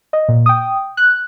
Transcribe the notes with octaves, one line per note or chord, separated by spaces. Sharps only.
D#5
A#2
G5 D#6
F#6